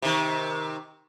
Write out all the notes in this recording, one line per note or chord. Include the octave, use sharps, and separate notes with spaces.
C3 D#3